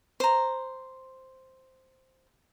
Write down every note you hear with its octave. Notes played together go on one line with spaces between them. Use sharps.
C5 A#5